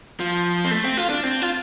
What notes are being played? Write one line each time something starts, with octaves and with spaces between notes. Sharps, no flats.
F3
C4
A3
C4
F4
D4
C4
F4